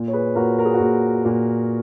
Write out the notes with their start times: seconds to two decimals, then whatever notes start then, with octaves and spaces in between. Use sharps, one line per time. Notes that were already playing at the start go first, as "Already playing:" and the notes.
Already playing: A#2
0.08 C#5
0.13 G#4 B4
0.35 A#2 F#4 A#4
0.59 A#4
0.65 G#4
0.74 F#4
0.80 A#2 G#4
1.25 A#2